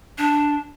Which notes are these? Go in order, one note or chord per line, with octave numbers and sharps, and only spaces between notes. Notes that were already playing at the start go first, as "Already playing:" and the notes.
D4